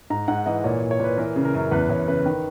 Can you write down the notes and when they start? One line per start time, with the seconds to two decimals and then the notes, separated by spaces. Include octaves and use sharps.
0.10 G#2 A#5
0.28 G#2 F#5
0.46 E3 D#5
0.64 A#2 C#5
0.82 A#2
0.91 C#5
1.00 A#2 B4
1.18 E3 A#4
1.36 C#3
1.45 A#4
1.54 F#2
1.71 E2 B4
1.89 E2 C#5
2.07 C#3 B4
2.26 D#3